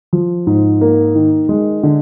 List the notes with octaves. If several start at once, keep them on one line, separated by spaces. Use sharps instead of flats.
F3
G#2
A#3
D#3
G#3
D3